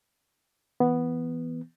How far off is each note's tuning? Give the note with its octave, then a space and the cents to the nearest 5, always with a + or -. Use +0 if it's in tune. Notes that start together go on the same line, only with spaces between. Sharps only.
E3 +0 B3 +0